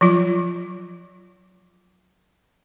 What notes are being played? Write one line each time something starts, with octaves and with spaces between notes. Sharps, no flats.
F3 F#3 F4